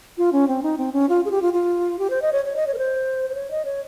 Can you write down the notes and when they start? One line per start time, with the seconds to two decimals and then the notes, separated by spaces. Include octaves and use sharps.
0.18 F4
0.33 C#4
0.48 C4
0.63 D#4
0.78 C4
0.93 C#4
1.09 F4
1.25 G#4
1.31 G4
1.42 F4
1.53 F4
1.99 G4
2.10 C5
2.22 D#5
2.33 C#5
2.45 C#5
2.56 D#5
2.67 C#5
2.74 A#4
2.78 C5
3.30 C5
3.35 C#5
3.51 D#5
3.65 C#5